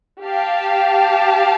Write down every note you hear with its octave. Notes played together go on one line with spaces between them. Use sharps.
G4 F5 A5